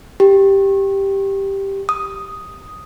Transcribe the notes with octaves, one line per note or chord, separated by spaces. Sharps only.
G4
D#6